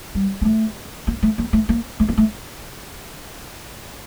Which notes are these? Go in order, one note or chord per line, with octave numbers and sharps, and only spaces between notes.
G3
A#3
A3
A#3
A3
A#3
A3
A#3
A3
A#3
A3